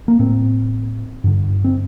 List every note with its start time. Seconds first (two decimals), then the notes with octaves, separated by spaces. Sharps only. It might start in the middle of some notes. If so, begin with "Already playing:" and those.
0.08 A#3
0.19 A2 C4
1.24 G2 D3
1.65 C4